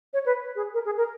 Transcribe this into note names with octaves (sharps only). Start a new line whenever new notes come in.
C#5
B4
G#4
A#4
G#4
A#4